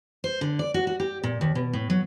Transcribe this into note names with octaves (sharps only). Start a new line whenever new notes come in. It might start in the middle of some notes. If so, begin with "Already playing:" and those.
C5
D3
D5
F#4
F#4
G4
A#2
D#2
B2
A2
F#3